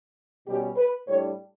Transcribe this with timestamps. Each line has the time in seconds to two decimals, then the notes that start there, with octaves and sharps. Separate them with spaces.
0.46 B2 G3 C#4 G4
0.76 B4
1.07 A2 G3 D4 C#5